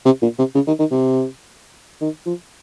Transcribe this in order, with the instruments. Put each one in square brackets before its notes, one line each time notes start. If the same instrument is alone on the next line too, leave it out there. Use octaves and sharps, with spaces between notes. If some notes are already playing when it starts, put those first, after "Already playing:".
[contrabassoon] C3
A#2
C3
C#3
D#3
D#3
C3
D#3
F3